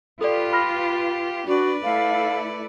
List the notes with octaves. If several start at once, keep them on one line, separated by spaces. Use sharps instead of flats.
F4 G4 A4 B4 D5
B5 F6 A#6
D4 F#4 B4 D5
A3 E4 A4 F5